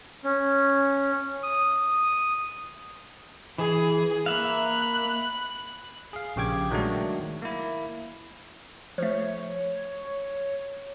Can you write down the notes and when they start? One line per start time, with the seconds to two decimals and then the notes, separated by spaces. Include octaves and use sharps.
0.24 C#4
1.43 D#6
3.58 E3 G#4
4.26 A#3 E5 F5 B5 F#6
6.13 G#4 F5
6.36 A#1 C#3 G4 G5 D6 G#6
6.71 D#3 F#3 G#3 A3 D4 F#4
7.42 A#3 E4
8.98 F3 A3 C#5